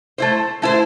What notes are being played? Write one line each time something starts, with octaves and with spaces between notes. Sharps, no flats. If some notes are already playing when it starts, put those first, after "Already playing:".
A3 E4 C5
A3 E4 C5